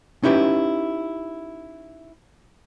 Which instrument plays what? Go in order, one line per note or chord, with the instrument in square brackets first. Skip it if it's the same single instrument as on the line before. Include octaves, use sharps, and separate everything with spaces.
[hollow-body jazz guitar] C#4 D#4 E4 G4 B4